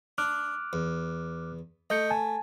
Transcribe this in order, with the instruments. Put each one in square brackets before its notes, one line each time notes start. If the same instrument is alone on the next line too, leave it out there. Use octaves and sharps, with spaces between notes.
[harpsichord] D4 [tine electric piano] D6 F6 F#6
[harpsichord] E2
[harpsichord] A3 [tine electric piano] D#5 G6 C#7
[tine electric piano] G#5 A5